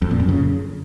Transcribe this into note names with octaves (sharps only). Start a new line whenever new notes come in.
F2
A#2
F#2
C#3